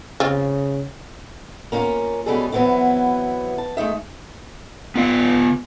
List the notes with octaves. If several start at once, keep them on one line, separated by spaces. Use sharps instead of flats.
C#3 C4 F4
A#3 C#4 E4 F4 A#4
B2 G3 G#3 C#4 G#4 A4
E3 F#3 B3 C4 E4
A5
G#3 A3 D#4 E5
B3 F4 F5